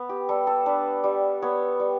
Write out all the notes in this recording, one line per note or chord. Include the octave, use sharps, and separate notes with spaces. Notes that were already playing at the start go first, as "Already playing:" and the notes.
Already playing: B3 B4
G4
G3 A4
A4
D4 B4
G3
B3 C#5
G3